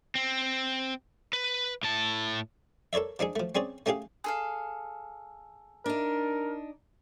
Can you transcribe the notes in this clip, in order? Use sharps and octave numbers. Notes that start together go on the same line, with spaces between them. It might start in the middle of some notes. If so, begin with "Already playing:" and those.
C4
B4
A2 A5
A4 A#4 C#5 D5 E5
F3 D4 D#4 G#4
F3 A3
C4 C#4 G#4 C#5 D5
A3 C#4 G4 G#4 F5
G#4 A4 F5
D4 D#4 A#4